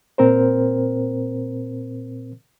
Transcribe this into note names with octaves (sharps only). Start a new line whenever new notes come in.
A#2 C4 A#4 C5